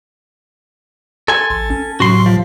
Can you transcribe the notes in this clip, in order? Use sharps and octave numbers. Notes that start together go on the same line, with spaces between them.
A4 G#5 C6
A1
C#4
A2 C3 F#3 F#4 C6
F3